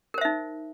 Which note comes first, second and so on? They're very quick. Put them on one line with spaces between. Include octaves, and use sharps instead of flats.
A#4 C5 E5 D#4